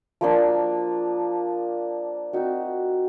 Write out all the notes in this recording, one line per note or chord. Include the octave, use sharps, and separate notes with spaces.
F3 A#3 D4
C4 D#4 F#4